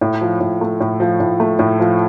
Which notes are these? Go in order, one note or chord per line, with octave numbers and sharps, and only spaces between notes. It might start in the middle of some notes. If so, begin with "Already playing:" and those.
A2
F3
A2
A3
A2
F3
A2
A3
A2
F3